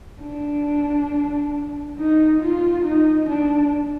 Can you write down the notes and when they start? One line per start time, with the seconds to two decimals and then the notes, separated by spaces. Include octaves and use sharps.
0.21 D4
1.98 D#4
2.42 F4
2.85 D#4
3.29 D4